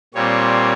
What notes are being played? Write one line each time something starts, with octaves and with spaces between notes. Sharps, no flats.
A#2 G3 C4 C#5